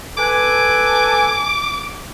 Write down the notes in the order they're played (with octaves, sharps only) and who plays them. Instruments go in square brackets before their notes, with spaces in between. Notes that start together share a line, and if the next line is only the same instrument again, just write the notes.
[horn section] A4 B4 G#5 [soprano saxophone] D6